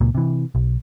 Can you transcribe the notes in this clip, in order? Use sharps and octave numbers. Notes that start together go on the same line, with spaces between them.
C#2 A#2 A#3
C3 E3
B1